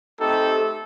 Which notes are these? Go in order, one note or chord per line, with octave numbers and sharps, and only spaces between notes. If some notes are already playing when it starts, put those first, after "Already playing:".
A3 C4 D#4 G4 A4